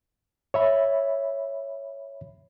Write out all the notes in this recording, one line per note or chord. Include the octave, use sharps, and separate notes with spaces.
C#5 E5 B5